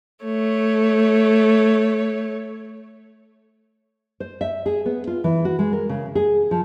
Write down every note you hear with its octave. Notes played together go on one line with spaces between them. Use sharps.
A3 C#5
C5
E5
G#4
B3
F4
E3
F#4
G#3
A#4
C#3
G#4
F3